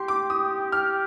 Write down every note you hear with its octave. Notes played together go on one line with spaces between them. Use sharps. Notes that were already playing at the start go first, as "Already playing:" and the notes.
Already playing: G4 C6
D6
D#6
F6